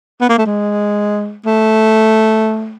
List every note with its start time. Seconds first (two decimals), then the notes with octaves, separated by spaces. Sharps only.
0.21 B3
0.29 A#3
0.38 A3
0.46 G#3
1.45 A3